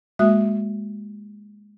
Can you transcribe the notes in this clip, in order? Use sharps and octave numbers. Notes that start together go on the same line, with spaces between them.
G#3 A#3 F#4 E5 D#6 F#6